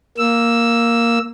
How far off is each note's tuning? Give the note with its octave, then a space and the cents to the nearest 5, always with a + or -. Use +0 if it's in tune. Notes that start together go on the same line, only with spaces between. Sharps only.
A#3 +0 E6 +0